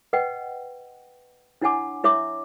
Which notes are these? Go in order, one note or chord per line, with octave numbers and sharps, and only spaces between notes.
B4 D#5 F#5 G5
D4 E4 C#5 F#5 G#5 D6
E4 C#5 E5 D6